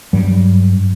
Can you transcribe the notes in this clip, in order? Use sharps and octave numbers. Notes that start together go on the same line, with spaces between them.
G2 F#3 G3